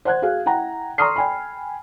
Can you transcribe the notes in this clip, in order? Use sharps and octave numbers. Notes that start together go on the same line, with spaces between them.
C5 F#5 F#6 G#6
F#4 G#4 F5
E4 F#5 G5 A#5
A#5 C6 C#6 D#6 F6 C7
G5 G#5 B5